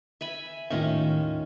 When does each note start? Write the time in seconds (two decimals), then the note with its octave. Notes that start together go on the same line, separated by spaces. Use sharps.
0.21 E5 G#5 B5
0.71 D#2 A2 D#3 C#4 F4 E5